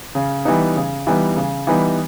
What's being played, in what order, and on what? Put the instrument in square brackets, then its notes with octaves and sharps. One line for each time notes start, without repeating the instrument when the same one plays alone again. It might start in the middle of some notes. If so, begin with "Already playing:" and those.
[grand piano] C#3
E3 G3 B3 D#4
C#3
E3 G3 B3 D#4
C#3
E3 G3 B3 D#4